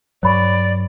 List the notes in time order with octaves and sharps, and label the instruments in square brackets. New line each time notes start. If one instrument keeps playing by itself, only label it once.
[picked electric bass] G2 F#3 [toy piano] C#5 B5 C#6 [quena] D5